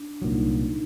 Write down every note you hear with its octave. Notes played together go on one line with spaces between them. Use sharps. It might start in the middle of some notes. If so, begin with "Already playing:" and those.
Already playing: D4
C2 A#2 F#3 D#4